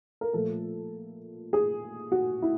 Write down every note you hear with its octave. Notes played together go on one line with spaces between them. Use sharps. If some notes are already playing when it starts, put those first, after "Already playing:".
A#4
A#2 F3 A3 A4
G#4
F#4
E4